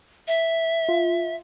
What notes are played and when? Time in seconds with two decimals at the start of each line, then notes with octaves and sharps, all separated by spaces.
0.28 E5
0.89 F4